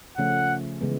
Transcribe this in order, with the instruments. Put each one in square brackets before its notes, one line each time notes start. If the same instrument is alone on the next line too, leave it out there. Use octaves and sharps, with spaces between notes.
[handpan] C#3 F3 A3 C#4 [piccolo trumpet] F#5
[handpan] C#3 E3 G#3 B3